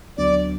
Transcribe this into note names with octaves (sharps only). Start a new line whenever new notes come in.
D2 D3 F#3 B3 D4 D5